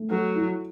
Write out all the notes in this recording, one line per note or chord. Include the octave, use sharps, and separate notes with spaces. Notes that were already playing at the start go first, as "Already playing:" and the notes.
Already playing: A3
F#3 A4
E4